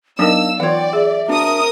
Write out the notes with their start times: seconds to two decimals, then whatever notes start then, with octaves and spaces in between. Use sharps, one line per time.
0.19 F#3 B3 D4 D#4 A#4 D#5 F5 E6
0.60 E3 F4 C#5 D5 F#5 G5
0.93 G#4 E5
1.28 D4 F#4 A#4 D#6